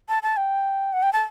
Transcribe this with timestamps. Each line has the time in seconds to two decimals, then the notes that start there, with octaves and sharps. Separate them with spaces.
0.09 A5
0.23 A5
0.37 G5
0.93 F#5
1.03 G5
1.13 A5